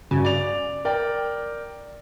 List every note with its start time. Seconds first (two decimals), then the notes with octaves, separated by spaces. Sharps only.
0.11 G2 C#3 F#4
0.25 D5 F7
0.85 A#4 D5 G5